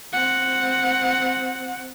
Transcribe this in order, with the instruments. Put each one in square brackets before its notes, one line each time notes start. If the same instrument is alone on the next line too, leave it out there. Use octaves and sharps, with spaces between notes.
[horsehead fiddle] C4 F#5